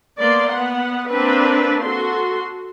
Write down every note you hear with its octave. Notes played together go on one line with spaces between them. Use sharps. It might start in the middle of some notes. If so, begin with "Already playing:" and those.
A#3 B3 D5 C6
B3 F#5
A#3 C4 D4 B4
F#4 A4 C6